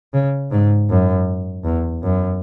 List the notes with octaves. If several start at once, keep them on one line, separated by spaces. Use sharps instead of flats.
C#3
G#2
F#2
E2
F#2